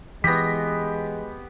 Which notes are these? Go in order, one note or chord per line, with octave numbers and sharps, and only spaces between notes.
E3 G#3 B3 G4 A#6 B6